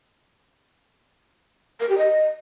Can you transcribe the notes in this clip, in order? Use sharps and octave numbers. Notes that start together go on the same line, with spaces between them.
A#4
G4
D#5